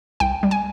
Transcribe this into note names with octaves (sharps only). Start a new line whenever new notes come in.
C2 G5
G3
G#5